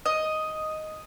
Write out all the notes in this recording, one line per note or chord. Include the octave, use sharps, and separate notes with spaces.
D#5